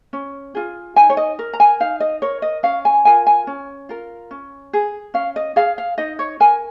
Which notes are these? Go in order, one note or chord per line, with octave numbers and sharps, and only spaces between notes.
C#4
F4 G#4
D#4 G#5
C#5
D#5
A#4
A#5
G#5
D#4 F5
D#5
A#4 C#5
D#5
C#4 F5
G#5
F4 A#4 G#5
G#5
C#4
F4 A#4
C#4
G#4
C#4 F5
D#5
G#4 F5
F5
D#4 D#5
C#5
A#4 G#5